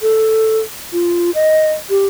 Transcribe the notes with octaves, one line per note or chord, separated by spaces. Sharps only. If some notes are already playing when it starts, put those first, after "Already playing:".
A4
F4
D#5
G4